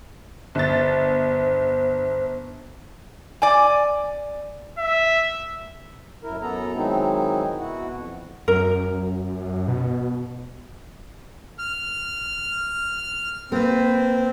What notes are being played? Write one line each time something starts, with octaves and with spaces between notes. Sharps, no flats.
G1 C5 A6
D5 G#5
E5
F#2 E4 A#4
F#2 B3 A4 A#5
D#3 F#3 G#3 C4 D#4 E4
B2 E4 F#4 F#5
F2
F#2 A#4
B2
F6
A#3 C4 B4